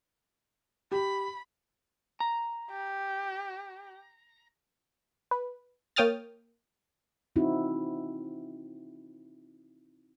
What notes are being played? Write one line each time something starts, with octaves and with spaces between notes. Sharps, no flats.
G4 B5
A#5
G4
B4
A#3 C#5 G5 D#6 F6 A6
C4 D#4 E4 F#4